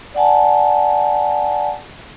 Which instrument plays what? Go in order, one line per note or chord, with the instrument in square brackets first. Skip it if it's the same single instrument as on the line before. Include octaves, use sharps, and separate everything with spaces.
[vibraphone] D5 F#5 G#5 A5